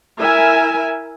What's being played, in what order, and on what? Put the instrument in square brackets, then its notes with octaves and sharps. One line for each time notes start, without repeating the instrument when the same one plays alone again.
[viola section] E4 A#4 E5 G#5